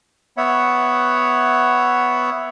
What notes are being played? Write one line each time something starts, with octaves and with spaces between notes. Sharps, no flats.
B3 C#5 E5 F#5